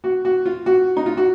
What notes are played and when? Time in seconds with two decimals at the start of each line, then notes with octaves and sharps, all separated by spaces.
0.04 F#4
0.25 F#4
0.46 F4
0.66 F#4
0.97 D#4
1.06 F4
1.17 F#4